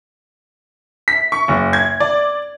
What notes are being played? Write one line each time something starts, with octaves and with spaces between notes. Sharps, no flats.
B6
C#6
F#1
G#6
D5